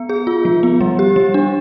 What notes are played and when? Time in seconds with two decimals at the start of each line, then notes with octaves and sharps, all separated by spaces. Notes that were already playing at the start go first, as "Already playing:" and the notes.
Already playing: B3
0.09 G#4
0.27 F4
0.45 F3
0.63 B3
0.81 G3
0.99 G4
1.16 G3
1.34 D4